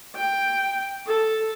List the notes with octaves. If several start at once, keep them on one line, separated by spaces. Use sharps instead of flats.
G5
A4